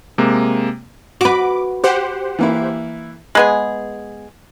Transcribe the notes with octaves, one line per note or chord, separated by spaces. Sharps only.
C3 G#3 A#3
F#4 B4 D6
G4 C5 F#5
E3 A#3 E4
G#3 B3 G#4